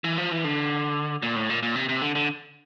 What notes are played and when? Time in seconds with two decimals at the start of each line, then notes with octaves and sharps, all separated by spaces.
0.04 E3
0.18 F3
0.31 E3
0.44 D3
1.22 A#2
1.36 A2
1.50 A#2
1.63 A#2
1.76 C3
1.89 C3
2.02 D3
2.15 D3